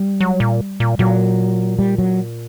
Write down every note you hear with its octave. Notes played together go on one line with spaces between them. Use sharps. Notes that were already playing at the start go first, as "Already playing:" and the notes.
Already playing: G3
F#3
A#2
A#2
A#2 F#3
G3
F#3